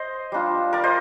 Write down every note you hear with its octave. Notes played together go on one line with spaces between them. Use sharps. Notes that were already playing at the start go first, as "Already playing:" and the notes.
Already playing: C5 D#5
G3 D4 F4
A#4 D5
C5 D#5